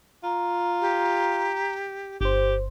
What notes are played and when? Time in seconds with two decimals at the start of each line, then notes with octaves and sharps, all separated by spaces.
0.24 F4 A#5
0.81 G4
2.21 G1 G4 C5